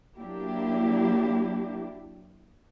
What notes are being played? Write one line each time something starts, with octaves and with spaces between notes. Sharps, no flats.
F#3 A#3 D4 E4 G4